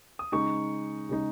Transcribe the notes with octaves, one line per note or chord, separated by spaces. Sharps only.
D#6
C#3 G#3 D#4 C#6
C#3 G#3 D#4